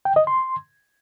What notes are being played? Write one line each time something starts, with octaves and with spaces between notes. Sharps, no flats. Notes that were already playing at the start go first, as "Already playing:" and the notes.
G5
D#5
C6